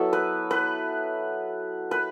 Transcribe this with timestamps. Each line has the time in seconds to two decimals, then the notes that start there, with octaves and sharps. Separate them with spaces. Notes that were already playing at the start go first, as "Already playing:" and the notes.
Already playing: F#3 B3 E4 A4
0.13 B4
0.51 B4
1.91 B4